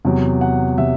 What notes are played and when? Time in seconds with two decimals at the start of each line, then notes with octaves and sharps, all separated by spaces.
0.05 E2 C3 F#3
0.41 F#5
0.78 C3 F#3 E5